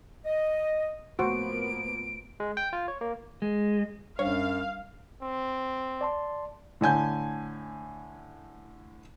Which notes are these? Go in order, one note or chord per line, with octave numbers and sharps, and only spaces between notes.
D#5
A2 F3 A#3 B3 F#4 C5 F#5 D7
G#3
G5
F4
C#5
A#3
G#3
F#2 G3 D4 C5 C#5 F5
C4
D5 A5 C6
A2 D3 G#5 G6